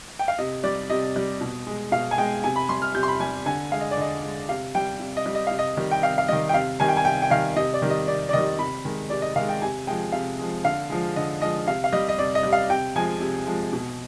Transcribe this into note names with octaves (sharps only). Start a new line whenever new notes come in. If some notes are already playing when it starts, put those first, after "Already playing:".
G5
F5
C3 D#5
G3 D5
C3 D#5
G3
B2
G#3
B2 F5
G#5
G#3 G5
C3 G#5
B5
G3 C6
F6
C3 G6
C6
B5
G3 G#5
D3 G#5
G#3 F5
D#5
D5
D3 D#5
G#3
C3 F5
G3 G5
C3
D#5
G3
D#5
C3 F5
D#5
D#3 G3
G5
C3 F5
F5
D#3 G3 D#5
G5
C3 F5
D#3 G3 G#5
G5
G#5
C3 G5
G5
D#3 G3 F5
C3 D#5
D5
D#3 G3
D#5
C3 D5
D5
D#3 G3 D#5
C3 B5
D#3 G#3
C3 D5
D#5
D#3 G#3 F5
G5
C3 G#5
F3 G#3 G5
C3 F5
F3 G#3
D3 F5
F3 G#3
D3 D#5
F3 G#3 D#5
C3 F5
F5
G3 D#5
D#5
C3 D5
D#5
G3
F5
C3 G5
F3 G#3 G#5
C3
F3 G#3
B2